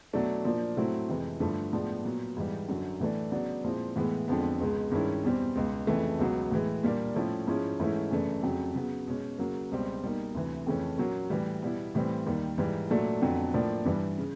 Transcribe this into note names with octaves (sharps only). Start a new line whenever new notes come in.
B2 F#3 A3 D4
A#2 F3 A#3 D4
A2 F#3 A3 C4 E4
F2 C3 E3 G#3
G2 D3 F3 A3
A2 F3 G#3 B3 D4
A#2 F#3 B3
G#2 E3 G3
F#2 D3 F#3
A2 E3 A3 D4
C#3 F#3 B3 D4
A#2 F3 G#3 C4 E4
A2 E3 G#3 B3
F2 D3 F3 G#3 B3
C#2 B2 G#3
G2 D#3 G#3 C#4 E4
E2 B2 G3 C4
C#2 B2 G#3
F2 C#3 E3 A3
C#2 B2 F#3 B3
A2 E3 G#3
A#2 G3 A#3 D4
A2 F3 A3 C#4 E4
G#2 F3 G#3 C#4 E4
G#2 E3 A3 C#4 E4
F#2 C#3 E3 A3 D4
F2 C#3 F#3
C#3 F#3 B3
B2 G#3 C#4
C#3 F#3 A#3
C#2 B2 G3 C4
B2 G3 A#3 D#4
D2 C3 E3
F2 C#3 E3 A3 C#4
A#2 F#3 A#3 C#4
A2 E3 G3
B2 G3 B3 E4
A2 E3 G3 C4
D#2 D#3 G3
G#2 E3 G3
A#2 F#3 A3 D4
F2 D3 F#3 B3
A2 F3 A#3 D4
G2 E3 G3
C#3